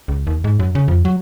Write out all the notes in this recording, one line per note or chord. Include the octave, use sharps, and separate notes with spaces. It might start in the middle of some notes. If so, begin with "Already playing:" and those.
C#2
D#2
G#2
F#2
C#3
F2
F#3